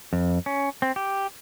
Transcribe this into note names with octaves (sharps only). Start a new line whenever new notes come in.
F2
C#4
C4
G4